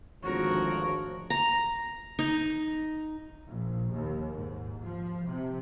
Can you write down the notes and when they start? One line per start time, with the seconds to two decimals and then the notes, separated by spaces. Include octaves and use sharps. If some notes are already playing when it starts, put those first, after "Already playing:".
0.23 G#1 D2 F3 F#4 A#4 C#5
1.30 A#5
2.19 D#4
3.48 A#1
3.91 D#2
4.33 G#2
4.83 F3
5.27 C3